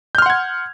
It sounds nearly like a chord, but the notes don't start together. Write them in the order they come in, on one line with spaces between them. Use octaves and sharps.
G6 F6 C6 F#5 G#6